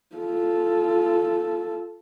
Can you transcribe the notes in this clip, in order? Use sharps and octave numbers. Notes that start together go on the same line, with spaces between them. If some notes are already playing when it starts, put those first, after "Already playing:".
F4 A4